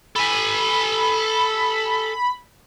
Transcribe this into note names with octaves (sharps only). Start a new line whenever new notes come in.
A4 G#5 B5